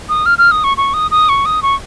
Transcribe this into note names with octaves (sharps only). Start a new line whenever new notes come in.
D#6
F6
F6
D#6
C#6
C#6
D#6
D#6
C#6
D#6
C#6